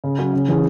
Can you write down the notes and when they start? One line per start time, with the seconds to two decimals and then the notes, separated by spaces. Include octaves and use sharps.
0.04 C#3
0.18 F#3 C#4
0.33 C#3
0.48 E3 C#4 G#4